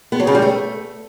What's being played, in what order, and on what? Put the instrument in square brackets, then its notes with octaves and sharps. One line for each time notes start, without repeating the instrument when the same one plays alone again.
[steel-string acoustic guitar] B3
F#3
C#3
G3
A3